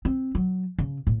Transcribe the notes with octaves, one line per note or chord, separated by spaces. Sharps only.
C4
F#3
C#3
A2